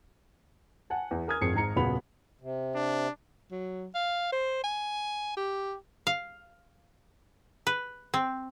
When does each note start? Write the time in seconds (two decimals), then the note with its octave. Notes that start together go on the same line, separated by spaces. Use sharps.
0.90 F#5 G#5 A5
1.11 E2
1.28 A#4 G#5 D#6 F6 G#6
1.41 G#1 F2 G#4 C7 C#7
1.54 G#1 G#2 A#5 C#7
1.76 D#1 C#3 B3 F#4 B5 F7
2.41 C3
2.75 D4
3.51 F#3
3.94 F5
4.32 C5
4.64 G#5
5.37 G4
6.07 F5
7.67 B4
8.14 C4